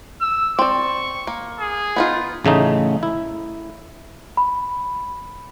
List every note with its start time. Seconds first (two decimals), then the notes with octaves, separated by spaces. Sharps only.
0.21 E6
0.59 C4 D5 C#6
1.27 A#3
1.60 G#4
1.96 B3 D#4 F4
2.45 A1 C#3 A3 D#4
3.03 E4
4.37 B5